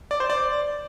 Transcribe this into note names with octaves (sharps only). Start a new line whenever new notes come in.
D5
C5
D5